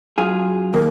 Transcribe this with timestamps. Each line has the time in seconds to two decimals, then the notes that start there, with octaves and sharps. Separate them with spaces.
0.18 F#2 F4 G#4
0.74 D#2 A#4